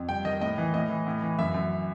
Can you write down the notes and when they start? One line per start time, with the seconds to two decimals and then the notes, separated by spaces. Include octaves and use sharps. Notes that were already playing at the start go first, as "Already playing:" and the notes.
Already playing: F2
0.09 G2 G5
0.25 D#3 D#5
0.41 A2 D#5
0.58 E3
0.74 A2 D#5
0.89 E3
1.07 A2
1.22 E3
1.38 F#2 E5
1.54 F#2